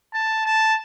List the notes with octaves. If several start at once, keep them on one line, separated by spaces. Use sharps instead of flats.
A5
A5